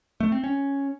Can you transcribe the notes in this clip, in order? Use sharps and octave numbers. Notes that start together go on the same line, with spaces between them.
A3
C4
C#4